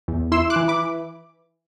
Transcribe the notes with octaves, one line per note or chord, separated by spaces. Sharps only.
E2
E4 C6 E6
D6 F#6
E3
B5 D6